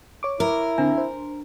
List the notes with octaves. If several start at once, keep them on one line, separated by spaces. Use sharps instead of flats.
C#5 D6
E4 A#4
D3 C4 D4 A#5
C5